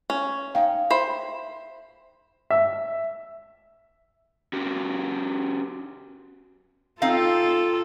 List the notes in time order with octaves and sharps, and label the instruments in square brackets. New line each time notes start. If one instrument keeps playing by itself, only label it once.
[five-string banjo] C#4
[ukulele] D#4 G5 [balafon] F5
[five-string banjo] C5 B5 [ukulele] E5
[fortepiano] E5
[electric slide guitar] C#4 F#4 G4
[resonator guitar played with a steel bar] C4 D#4 F5 [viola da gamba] F4 A4